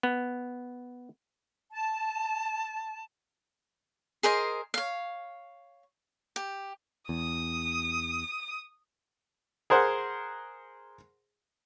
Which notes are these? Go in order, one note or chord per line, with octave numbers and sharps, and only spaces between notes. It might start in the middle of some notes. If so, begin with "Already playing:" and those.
B3
A5
G#4 A#4 C5 D#5
C#5 F5
G4
E2 D#6
G#4 A#4 C5 F#5